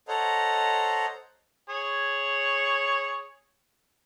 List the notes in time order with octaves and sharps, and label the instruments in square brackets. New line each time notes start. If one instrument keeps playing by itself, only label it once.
[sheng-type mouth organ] A4 C5 C#5 D#5 F#5 A#5
[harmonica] G#4 C#5